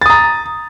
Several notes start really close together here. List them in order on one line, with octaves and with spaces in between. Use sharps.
A6 D#6 A#5